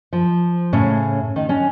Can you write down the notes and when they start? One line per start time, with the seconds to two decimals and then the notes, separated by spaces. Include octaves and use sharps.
0.13 F3
0.73 A2 C#3 C#4
1.36 D#3 D#4
1.49 C#4 D4